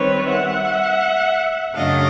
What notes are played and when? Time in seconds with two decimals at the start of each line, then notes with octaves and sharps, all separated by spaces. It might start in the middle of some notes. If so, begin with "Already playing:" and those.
Already playing: D#3 G3 C4 B4 C#5
0.29 E5 F#5
1.74 F#2 C#3 F#3 A3 D4 D#5 F5